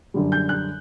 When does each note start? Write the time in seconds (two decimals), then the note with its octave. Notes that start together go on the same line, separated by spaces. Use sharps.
0.14 F#2 D3 G3
0.32 G6
0.49 F#6